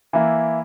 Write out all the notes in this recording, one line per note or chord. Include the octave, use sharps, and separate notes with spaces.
E3 A#3 E4